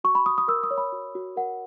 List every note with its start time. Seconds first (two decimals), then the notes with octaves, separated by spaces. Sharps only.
0.04 F#4 C#6
0.15 B5
0.26 F#4 D#6
0.38 D#6
0.48 A#4 E6
0.63 D#6
0.71 C#5
0.78 B5
0.92 F#4
1.15 F#4
1.36 A#4 F#5